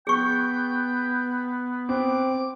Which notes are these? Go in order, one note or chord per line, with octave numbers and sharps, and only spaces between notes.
B3 G#4 G5 C#6
C4 D6